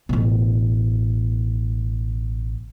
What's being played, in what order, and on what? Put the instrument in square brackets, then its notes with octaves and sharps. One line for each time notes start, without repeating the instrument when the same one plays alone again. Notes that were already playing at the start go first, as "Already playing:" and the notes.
[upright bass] A1 B2